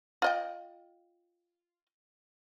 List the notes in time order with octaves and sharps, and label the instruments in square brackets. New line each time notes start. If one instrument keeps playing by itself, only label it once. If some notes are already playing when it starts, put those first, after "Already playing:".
[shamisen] F4 D#5 G5